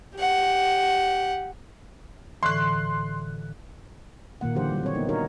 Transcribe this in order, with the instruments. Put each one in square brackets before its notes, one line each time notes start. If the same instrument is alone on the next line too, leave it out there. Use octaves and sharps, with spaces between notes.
[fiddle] G4 F#5
[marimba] A2 D3 E3 [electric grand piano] C6 F#6
[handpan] A#2 D#3 A#3 F#5
D3 E3 F#3 G4 C5 F#5
G3
C4 C#5
A#3 B3 D#4
D4 D#4 F#4 A#4 C#5